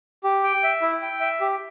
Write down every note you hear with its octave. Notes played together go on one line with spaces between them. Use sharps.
G4
G5
E5
E4
G5
E5
G4